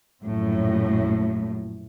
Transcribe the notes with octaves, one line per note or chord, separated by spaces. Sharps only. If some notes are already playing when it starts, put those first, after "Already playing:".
A#1 F#2 A2